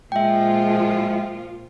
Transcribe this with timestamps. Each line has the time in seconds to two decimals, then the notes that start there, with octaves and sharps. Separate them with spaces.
0.12 A#2 F3 G#3 F4 E5 G5